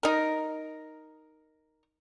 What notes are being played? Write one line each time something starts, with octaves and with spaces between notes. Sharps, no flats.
D#4 A#4